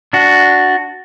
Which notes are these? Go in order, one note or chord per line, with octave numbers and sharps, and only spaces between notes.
D4 F#4